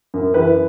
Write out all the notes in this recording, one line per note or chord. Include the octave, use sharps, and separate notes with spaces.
F#2
E3 B4